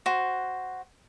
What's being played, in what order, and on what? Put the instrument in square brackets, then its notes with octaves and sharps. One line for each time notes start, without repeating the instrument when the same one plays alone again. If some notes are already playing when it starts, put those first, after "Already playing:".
[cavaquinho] F#4 C5